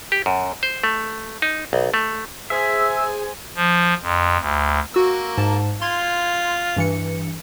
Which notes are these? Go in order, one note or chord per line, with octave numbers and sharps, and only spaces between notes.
G4
F#2
C5
A3
D#4
B1
A3
G#4 C5 E5 G#5
F3
F2
D2
A#3 F#4 E6
G#2 A5
F4 C6 G#6
G2 E3 C#7